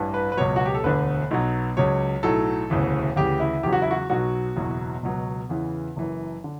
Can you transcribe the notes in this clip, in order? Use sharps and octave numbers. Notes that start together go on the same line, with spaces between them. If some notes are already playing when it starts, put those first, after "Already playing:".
Already playing: A1 G2 E3
B4
B4
C#2 B2 F#3 C#5
F#4
G4
A4
E1 D2 D3 B4
B1 B2 F#3
C#2 C#3 F#3 C#5
B1 A2 F#3 A4
E1 D2 C#3 E3
D2 C#3 E3 G4
E4
E2 C#3 F#3 G4
F#4
E4
F#4
B1 B2 F#3 F#4
F#1 E2 B2 F#3
C#2 B2 F#3
E2 C#3 E3
F#1 F#2 E3
D3